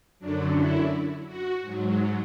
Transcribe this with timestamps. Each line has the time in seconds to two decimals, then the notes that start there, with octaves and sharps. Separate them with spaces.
0.19 F#2 D3 F#3 D4
0.55 E4
1.26 F#4
1.62 G#2 F#3